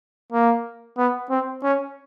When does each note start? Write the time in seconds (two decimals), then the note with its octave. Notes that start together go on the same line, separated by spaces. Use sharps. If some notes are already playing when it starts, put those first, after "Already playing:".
0.32 A#3
0.97 B3
1.30 C4
1.63 C#4